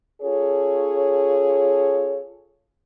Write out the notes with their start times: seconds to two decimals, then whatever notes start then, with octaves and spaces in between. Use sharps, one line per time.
0.22 C#4 F4 G#4 A4 C#5